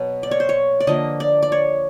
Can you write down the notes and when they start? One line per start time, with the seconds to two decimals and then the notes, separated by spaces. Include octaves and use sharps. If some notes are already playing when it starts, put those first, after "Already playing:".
Already playing: B2 F#3 B3
0.23 D5
0.31 C#5
0.40 C5
0.49 C#5
0.80 D5
0.87 D3 F3 A#3 D#5
1.20 D5
1.42 D5
1.52 C#5